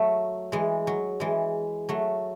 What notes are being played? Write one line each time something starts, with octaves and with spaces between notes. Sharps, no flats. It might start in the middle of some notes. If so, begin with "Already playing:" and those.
Already playing: F#3 A3
E3 G#3
F#3
E3 G#3
F#3 A3